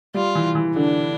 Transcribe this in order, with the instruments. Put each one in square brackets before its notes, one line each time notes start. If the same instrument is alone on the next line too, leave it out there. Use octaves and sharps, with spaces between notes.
[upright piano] G3 [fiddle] F4
[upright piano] E3
E3
[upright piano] D3 [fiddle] D4